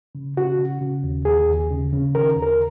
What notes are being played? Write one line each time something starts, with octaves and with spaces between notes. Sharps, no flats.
C#3
C#3 F#4
C#3
C#3
D#2
D#2 G#4
D#2
C#3
C#3
D#3 A#4
D#2
A#4